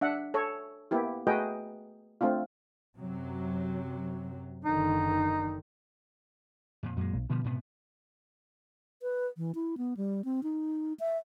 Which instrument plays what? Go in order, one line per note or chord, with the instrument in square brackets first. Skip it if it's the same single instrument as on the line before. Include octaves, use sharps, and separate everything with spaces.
[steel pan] D4 E5 F#5
A4 C#5
A#3 B3 E4 G4
A3 F#4 G#4 B4 D#5 G5
A3 C4 D4 F4
[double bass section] F#2 C3 F#3
[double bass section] F#1 D3 D#3 [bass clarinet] D#4
[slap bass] F2 A#2
[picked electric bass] F#2 [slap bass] A#2 G#3
[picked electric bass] B1
[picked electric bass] B2 [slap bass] D3 F3 G3
[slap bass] G#2 C3 B3
[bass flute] B4
E3
E4
B3
G3
C4
D#4
E5